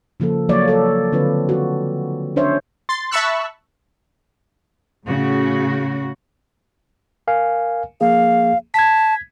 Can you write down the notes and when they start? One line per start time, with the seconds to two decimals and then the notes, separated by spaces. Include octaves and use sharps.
0.20 C#3 F3 A#3 A4
0.49 F3 F#3 A#3 C#5 D5
0.68 A4 D5
1.12 D3 C4 F4 B4
1.49 F#4
2.36 C#4 D4 C5 C#5 E5
2.89 C6 A6
3.11 E5 A5 B5 C#6 E6 F#6
5.05 A2 C#3 F#4
7.27 A#4 F5 G#5
8.01 F3 A#3 G#4 F5
8.74 A5 G#6 B6